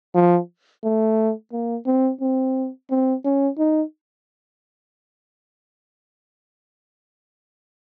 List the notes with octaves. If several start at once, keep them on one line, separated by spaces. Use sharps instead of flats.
F3
A3
A#3
C4
C4
C4
C#4
D#4